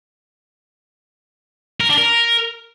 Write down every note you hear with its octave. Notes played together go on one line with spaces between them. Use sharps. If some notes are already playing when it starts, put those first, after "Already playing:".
A#4
D4
A#4